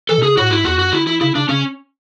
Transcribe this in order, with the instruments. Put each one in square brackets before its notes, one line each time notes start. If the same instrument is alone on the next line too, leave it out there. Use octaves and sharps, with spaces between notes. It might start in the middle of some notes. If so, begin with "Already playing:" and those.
[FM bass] E3 [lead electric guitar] A4
[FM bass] B2
[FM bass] C#3 [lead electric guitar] G#4
[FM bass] A2 [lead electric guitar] F#4
[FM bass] G#2 [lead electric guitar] E4
[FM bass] E2 [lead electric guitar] F#4
[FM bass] F#2 [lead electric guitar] F#4
[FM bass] D3 [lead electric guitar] E4
[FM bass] E3 [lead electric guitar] E4
[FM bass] C#3 [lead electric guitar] E4
[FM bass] C#3 [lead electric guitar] D4
[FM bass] C#3 [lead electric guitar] C#4